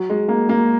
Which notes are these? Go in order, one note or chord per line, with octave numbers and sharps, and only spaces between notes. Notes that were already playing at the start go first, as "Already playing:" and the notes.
Already playing: F#3
G#3
A#3
A#3